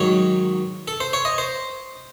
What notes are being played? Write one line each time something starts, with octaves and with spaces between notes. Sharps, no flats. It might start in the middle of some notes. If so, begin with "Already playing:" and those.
Already playing: G#2 D#3 F#3 C#5
A4
C5
C#5
D#5
C5